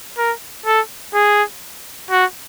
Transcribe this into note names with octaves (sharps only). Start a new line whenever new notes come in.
A#4
A4
G#4
F#4